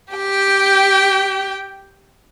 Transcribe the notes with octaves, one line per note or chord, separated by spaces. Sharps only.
G4 G5